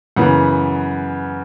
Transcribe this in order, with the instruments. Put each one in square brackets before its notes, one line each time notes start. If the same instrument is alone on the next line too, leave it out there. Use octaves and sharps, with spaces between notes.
[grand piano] F#2 C#3 E3 B3 F#5